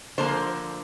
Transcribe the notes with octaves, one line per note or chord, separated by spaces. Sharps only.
D3 F3 A#3 C5